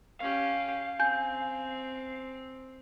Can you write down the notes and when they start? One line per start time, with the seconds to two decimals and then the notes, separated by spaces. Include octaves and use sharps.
0.20 C#4 G4 F5
0.99 C4 G#5 G6